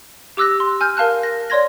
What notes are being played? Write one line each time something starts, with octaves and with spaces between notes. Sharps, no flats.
G4 D6 E6 F#6 A#6
C6
G#5 F6 G6
A#4 F5 A5 F#6
A#6
C#5 D5 C6 G#6 A#6